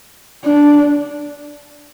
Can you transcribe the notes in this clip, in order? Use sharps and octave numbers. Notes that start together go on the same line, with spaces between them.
D4